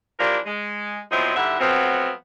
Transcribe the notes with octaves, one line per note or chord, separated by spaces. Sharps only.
E3 F3 A#3 D4 G4 A#4
G#3
B2 F3 F#3 C4 E4 D#5
G#2 D3 G3 E4 E5 F#5
F3 F#3 A3 B3 C4